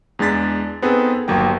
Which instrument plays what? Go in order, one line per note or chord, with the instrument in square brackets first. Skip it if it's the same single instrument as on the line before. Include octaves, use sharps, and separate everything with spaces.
[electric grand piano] E2 G#3 D4 A6 B6
B3 C4 D#4 G#4 A4 B4
G1 D#2 F#3 A#3 G5